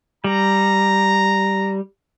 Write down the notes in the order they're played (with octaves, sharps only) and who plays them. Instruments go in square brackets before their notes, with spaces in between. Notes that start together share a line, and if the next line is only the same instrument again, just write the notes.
[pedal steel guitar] G3 [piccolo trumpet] A#5